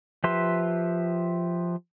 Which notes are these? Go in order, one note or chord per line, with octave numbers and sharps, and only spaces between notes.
F3 G4 B4 E5 C6